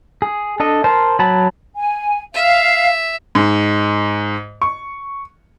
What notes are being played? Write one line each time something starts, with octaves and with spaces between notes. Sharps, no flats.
G#4
D4 A4 D#5
A#4 C5 A5
F#3 A5 B5
G#5
E5 F5
G#2
C#6